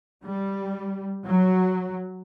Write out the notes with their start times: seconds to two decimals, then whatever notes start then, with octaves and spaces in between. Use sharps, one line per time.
0.25 G3
1.26 F#3